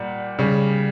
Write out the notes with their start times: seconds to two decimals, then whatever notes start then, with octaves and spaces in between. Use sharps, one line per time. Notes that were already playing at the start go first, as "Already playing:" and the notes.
Already playing: A#2 G3 F#5
0.39 C#3 G3